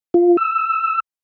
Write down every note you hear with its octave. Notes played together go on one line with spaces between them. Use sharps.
F4
E6